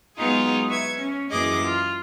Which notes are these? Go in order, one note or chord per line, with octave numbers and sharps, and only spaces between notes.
F#3 G#3 B3 D#4 F4 G#4
B4 E5 C#6 G#6
C#4
F#2 E3 A#3 G#4 D#5 D6
F4